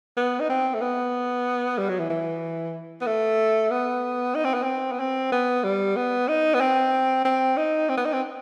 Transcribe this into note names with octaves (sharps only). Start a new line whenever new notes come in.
B3
D#4
C4
A3
B3
G3
F#3
E3
E3
B3
A3
B3
D#4
C4
B3
C4
B3
C4
B3
G3
B3
D#4
B3
C4
C4
D#4
C4
B3
D#4
C4